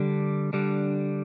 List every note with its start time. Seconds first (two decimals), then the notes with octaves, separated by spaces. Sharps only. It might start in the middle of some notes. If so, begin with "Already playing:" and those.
Already playing: D3 G3 D4
0.53 D3 G3 D4